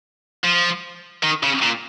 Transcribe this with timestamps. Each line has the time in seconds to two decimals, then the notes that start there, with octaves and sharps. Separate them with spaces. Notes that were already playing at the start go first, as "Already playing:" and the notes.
0.44 F3
1.23 D#3
1.43 C#3
1.63 A#2